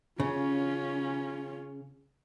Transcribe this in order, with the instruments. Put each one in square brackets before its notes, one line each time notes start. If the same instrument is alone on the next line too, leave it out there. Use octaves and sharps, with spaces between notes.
[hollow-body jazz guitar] C#3 [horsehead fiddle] C#4 F4